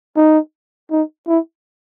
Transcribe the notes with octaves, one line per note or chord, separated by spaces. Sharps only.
D#4
D#4
E4